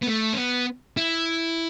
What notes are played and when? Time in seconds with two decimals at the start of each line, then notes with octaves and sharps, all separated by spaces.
0.02 B3
0.07 A3
0.33 C#4
0.38 B3
0.97 E4